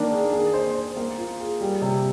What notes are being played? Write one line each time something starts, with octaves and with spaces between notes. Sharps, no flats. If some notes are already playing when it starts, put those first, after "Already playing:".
Already playing: D#3 A#3 D4
G#4
G#4
C5
C5
A#3
F4
G#4
G3
C3